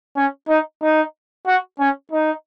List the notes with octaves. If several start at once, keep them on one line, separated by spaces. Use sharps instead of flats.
C#4
D#4
D#4
F#4
C#4
D#4